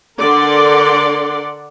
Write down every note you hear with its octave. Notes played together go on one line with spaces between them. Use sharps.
D3 A#4 D5 F#5 C6